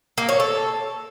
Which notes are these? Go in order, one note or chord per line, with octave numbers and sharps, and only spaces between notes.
A#3
C#5
A4